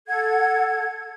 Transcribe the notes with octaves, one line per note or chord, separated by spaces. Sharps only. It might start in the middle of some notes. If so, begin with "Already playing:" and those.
A4 F#5 G#6